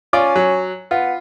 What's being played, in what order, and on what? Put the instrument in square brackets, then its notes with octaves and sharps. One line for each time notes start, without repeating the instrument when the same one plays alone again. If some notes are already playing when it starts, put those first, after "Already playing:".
[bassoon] C#4 [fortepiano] F4 D5 D6
[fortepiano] F#3
[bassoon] B3 [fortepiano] F4